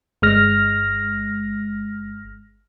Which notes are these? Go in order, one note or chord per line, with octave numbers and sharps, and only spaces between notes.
G1 G#3 F6 A#6